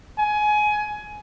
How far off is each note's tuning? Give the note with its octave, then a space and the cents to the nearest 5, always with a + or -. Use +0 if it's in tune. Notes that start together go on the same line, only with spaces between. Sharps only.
G#5 +20